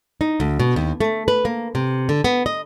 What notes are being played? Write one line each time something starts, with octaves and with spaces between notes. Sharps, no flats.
D#4
D2
B2
D#2
A3
B4
A#3
C3
D3
B3
D#5